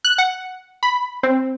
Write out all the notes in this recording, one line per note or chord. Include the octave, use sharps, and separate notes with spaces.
F#6
F#5
B5
C4